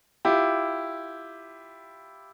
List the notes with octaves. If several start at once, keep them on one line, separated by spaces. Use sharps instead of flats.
E4 F4 G4